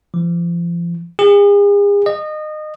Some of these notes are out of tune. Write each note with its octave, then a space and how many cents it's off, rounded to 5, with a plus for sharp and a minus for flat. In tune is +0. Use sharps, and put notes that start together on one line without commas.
F3 -35
G#4 -40
D#5 -25